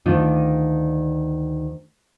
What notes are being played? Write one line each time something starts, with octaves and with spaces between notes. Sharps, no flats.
D2 D#3 D4 F4